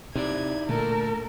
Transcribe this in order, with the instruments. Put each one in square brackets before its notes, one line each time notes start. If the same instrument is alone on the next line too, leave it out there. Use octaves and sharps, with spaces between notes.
[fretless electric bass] C3 [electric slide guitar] D#4 E4 D5 [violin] G#6
[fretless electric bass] A#2 D3 [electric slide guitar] A3 [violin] A4 [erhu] A#4